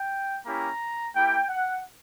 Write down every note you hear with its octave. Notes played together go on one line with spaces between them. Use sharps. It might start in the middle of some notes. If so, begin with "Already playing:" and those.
Already playing: G5
A#3 C#4 E4 G4 A#5
A#3 E4 G4 G5
F#5